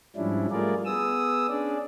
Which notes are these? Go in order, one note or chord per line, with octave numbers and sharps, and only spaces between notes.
G#2 F3 G3 C#4 D4 E4
G3 A3 F4 G#4 A#4 D5
B3 G#4 D#6 E6
C#4 D4 G#4 D5